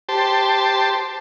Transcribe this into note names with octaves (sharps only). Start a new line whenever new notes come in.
G4 C5 A5